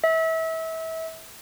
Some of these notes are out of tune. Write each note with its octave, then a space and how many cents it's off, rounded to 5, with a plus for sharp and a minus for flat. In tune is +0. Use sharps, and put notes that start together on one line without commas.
E5 -30